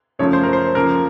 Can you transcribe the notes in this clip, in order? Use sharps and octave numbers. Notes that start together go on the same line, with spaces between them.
F#2 C#3 F3 A3 C#5
C5
A#4
C5
C#3 F3 A#3 A#4